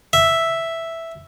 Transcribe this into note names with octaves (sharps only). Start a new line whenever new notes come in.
E5